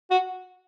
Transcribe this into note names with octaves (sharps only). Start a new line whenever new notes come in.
F#4